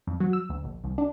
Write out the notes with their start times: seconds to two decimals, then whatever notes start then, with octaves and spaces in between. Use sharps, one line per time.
0.07 F2
0.20 F#3
0.33 E6
0.50 D2
0.64 A#1
0.84 C2
0.98 D4